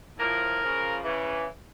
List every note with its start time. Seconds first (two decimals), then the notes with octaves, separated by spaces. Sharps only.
0.18 A2 F3 A#4
0.61 C#3 F3
1.03 C#3 E3